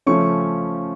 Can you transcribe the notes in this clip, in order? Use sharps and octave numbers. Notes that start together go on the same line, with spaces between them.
C#3 F3 A3 C#4 C#6